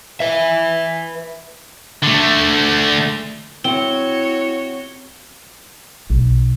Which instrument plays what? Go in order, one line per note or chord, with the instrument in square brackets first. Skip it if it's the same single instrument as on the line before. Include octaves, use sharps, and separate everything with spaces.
[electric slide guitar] B4 E5
[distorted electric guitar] D3 A3
[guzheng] C4 [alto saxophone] E4 [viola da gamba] F#4 C#5 [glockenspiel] G7
[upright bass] B1